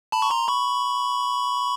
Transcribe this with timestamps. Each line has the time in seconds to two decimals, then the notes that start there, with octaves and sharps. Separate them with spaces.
0.12 A5 B5
0.22 C#6
0.30 A#5 C6
0.48 B5 C#6